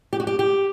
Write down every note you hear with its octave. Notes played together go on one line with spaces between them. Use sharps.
G4
F#4
G4
G4